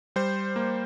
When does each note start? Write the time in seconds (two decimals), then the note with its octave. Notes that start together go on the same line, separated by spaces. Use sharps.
0.16 G3 C5
0.56 A#3